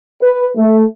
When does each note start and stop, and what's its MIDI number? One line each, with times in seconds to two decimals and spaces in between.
0.22 0.45 71
0.56 0.83 57